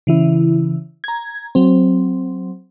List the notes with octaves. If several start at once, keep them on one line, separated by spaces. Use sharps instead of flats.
C#3 E3 E4
A#5 G#6
F#3 C4